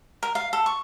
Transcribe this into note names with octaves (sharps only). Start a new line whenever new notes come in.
A#4
F5
A4
C#6